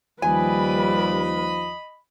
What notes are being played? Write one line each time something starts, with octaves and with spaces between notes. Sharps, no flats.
D#2 F3 G3 B4 D#5 G#5 B5